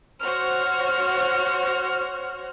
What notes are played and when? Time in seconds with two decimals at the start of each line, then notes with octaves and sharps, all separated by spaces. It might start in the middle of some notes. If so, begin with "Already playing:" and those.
0.22 F#4 C5 C#5 F6